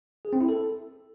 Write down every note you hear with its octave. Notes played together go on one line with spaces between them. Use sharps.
G#4
C4
E4
A4